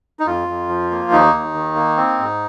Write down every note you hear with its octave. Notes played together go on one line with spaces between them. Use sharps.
D#4
F2 F4
F2
F3
A#3
D#2 D#4
D#2
D#3
A#3
C4
G#2